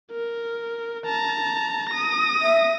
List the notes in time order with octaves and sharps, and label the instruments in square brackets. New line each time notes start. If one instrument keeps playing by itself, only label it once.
[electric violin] A#4
A5 A#5
D#6 A#6
[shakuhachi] E5